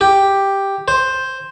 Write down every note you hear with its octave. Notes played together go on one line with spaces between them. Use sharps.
G4
C5